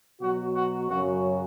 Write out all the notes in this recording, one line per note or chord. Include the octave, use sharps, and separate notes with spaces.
B2 F#3 F#4
F#4
F#2 C#3 F#3 F#4